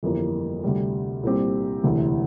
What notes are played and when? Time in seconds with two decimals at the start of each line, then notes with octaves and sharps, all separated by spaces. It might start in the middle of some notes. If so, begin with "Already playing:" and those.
0.03 G1 F2 E3 G3 A#3
0.63 D2 C3 G3
1.23 C2 A#2 G3 C4 G4
1.84 E1 D2 C3 E3